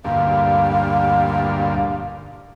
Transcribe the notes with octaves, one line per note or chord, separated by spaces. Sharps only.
D2 G2 A#2 F5